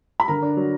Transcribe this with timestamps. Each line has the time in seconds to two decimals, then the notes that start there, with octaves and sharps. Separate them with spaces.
0.20 B5
0.28 D3 A#4 A#5
0.42 D4
0.57 F#3